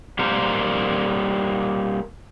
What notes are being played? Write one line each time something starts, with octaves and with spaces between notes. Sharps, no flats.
G3 A#3 A#4 C5